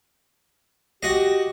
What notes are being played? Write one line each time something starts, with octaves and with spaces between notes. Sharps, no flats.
F#4 G4 D#5